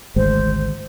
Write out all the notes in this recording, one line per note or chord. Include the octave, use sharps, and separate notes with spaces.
G#1 D2 G#3 C5